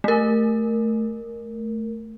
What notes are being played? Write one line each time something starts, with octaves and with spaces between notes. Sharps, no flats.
A3 A#4